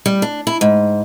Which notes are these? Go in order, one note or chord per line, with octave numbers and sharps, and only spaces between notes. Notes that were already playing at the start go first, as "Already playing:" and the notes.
G3
D4
E4
G#2